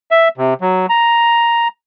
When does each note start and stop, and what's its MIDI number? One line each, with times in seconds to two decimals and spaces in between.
0.11 0.28 76
0.38 0.54 48
0.61 0.86 54
0.89 1.68 82